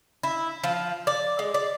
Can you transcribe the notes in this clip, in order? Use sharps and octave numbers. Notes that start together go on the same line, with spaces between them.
E4
F3
D5
G#3
D5